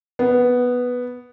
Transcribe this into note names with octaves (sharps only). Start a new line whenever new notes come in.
B3